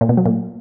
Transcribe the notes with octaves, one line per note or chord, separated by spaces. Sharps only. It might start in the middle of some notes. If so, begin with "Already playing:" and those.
A#2
B2
F#3
A#2